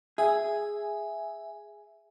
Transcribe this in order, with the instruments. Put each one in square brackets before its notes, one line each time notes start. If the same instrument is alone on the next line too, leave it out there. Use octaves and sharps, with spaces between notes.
[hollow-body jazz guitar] G#4 [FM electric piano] E5 G#5